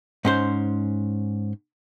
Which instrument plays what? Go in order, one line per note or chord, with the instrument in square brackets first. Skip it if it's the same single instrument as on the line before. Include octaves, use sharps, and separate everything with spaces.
[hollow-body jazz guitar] G#2 C#4 C5